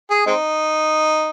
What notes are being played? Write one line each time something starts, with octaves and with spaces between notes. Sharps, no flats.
G#4
G#3 C4 D#4